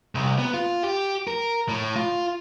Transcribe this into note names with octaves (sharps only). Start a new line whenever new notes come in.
C2
B3
F4
G4
A#4
A2
F4